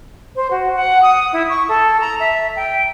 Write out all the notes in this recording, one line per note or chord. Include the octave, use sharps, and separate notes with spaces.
C5
F#4
F#5
D#6
E4
C#6
A4
A#5
E5
G5